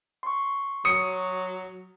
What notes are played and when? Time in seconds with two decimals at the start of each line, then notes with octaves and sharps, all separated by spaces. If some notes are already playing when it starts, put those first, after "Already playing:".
0.23 C6 C#6
0.85 F#3 D#6 C#7